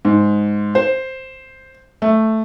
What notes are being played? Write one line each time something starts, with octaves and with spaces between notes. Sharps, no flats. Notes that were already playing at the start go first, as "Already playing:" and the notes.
G#2
C5
A3